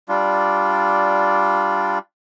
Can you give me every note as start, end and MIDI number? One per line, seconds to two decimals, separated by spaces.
0.09 1.99 55
0.09 1.99 62
0.09 1.99 65